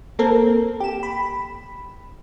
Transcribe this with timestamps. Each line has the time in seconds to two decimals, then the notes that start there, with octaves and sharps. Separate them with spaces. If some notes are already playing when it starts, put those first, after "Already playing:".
0.19 A#3 C4 A4 A#4
0.80 G4 E7
1.03 B5